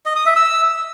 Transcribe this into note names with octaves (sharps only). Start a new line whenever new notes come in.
D#5
D#6
E5
E6